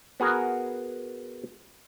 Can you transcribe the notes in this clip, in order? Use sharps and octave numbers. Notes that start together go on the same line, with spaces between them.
B3 F#4 G#4 A#4